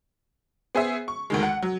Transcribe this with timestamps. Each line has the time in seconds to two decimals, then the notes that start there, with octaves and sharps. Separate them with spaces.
0.75 B3 G#4 C5 E5
1.08 C#6
1.30 D2 D#3 G#3
1.43 F#5
1.62 F#3